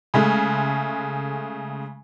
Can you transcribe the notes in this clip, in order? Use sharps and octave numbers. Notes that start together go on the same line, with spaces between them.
C#3 G#3 A3